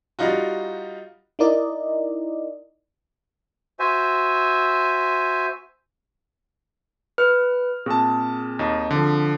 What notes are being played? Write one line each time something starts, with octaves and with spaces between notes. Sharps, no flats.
G3 D#4 F4 F#4
D#4 E4 A#4 D5 D#5
F#4 C5 E5 G#5
B4 F6
A#2 C4 G#4 A5
D#2 D#4
D3 F3